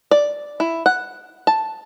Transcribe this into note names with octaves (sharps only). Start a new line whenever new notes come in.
D5
E4
F#5
A5